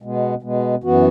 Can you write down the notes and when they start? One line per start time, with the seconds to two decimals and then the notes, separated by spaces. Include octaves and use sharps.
0.02 B2 G#3 B3
0.42 B2 G#3 B3
0.84 F#2 E3 B3 F#4